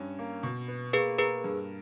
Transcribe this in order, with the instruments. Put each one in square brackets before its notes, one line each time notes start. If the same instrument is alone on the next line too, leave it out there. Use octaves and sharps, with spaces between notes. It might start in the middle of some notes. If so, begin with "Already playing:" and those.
Already playing: [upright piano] G2 C#4
A#3
B2
B3
[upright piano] A#3 [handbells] G#4 B4
[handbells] G#4 B4 [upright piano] A#4
[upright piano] G2